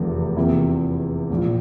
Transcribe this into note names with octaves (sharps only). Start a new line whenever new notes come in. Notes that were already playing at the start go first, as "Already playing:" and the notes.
Already playing: F1 E2 C3 F3 A3
E2 C3 F3 A#3 E4
A#1 A#2 F3